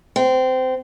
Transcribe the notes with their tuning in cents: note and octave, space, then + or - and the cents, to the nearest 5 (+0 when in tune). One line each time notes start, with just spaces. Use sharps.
C4 -20